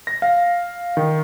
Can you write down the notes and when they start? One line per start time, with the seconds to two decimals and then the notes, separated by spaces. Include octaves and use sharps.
0.07 A#6
0.22 F5
0.97 D#3